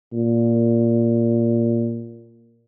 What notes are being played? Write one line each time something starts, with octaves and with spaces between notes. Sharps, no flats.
A#2